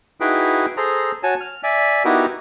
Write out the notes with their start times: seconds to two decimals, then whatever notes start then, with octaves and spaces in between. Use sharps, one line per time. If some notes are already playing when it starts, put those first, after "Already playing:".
0.20 D#4 E4 F#4 G#4 B4 G5
0.77 G#4 A4 C5 A#5
1.23 F#4 C#5 G#5 A5
1.41 F6
1.63 D5 E5 G#5
2.05 B3 D#4 E4 F#4 G4 A#4